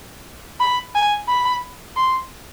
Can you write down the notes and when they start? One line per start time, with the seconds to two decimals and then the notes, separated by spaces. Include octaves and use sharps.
0.60 B5
0.95 G#5
1.28 B5
1.96 C6